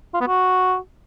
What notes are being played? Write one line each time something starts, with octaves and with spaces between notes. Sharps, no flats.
F4
B3
F#4